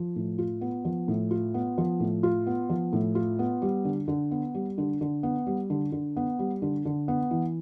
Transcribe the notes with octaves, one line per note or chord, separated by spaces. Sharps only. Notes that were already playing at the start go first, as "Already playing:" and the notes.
Already playing: F3
A2
F4
B3
F3
A2
F4
B3
F3
A2
F4
B3
F3
A2
F4
B3
G3
D3
D3
B3
G3
D3
D3
B3
G3
D3
D3
B3
G3
D3
D3
B3
E3